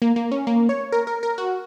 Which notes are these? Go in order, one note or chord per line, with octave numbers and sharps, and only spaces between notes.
A#3
A#3
C#4
A#3
C#5
A#4
A#4
A#4
F#4